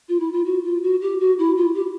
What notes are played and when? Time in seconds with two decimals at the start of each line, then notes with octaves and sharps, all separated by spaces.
0.09 F4
0.20 E4
0.33 F4
0.45 F#4
0.64 F4
0.82 F#4
1.01 G4
1.20 F#4
1.39 E4
1.57 F4
1.75 G4